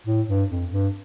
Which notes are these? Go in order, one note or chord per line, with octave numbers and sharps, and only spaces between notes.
A2
G2
F2
G2